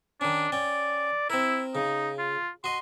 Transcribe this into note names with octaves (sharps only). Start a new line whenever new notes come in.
D#3 C#4 D4
C#4 D5 G5
C4 E4 A#4
C#3 D#4
F4
F#4 D#5 C6